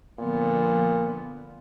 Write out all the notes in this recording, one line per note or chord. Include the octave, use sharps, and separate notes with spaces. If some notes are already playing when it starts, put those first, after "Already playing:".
A#2 D3 F3 B3